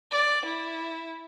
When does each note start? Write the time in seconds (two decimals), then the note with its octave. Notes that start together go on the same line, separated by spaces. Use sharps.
0.12 D5
0.46 E4